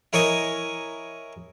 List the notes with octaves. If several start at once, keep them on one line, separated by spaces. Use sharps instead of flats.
E4 A#4 C#5 D#5 G#5 A#5